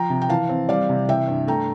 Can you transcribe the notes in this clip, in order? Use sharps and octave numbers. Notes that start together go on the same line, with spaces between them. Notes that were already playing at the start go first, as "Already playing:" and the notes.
Already playing: F3 G5 A#5
C3
G5
E3 F5 A5
C4
G3 D5 F5
C3
E3 E5 G5
G2
A3 G5 A#5